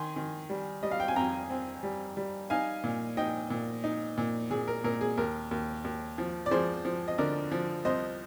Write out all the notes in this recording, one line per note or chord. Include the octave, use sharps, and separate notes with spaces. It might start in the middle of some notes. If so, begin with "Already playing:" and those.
Already playing: D#3 G#5 C6
D#3
G3
G3 D#5
F5
G5
G#5
F2 G5 A#5
C4
G3
G3
D#4 F5 G#5
A#2
D#4 D#5 G5
A#2
D#4
A#2
A#2 G#4
A#4
A#2 A#4
G#4
D#2 A#4
D#2
D#2
F3
D5
F3 G#4 C5
F3
D#5
D3 A#4 D5
F3
C2 C5 D#5